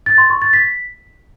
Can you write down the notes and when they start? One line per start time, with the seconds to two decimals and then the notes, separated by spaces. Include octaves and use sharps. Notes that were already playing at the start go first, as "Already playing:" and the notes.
0.06 A6
0.18 C6
0.30 C#6
0.42 A6
0.53 B6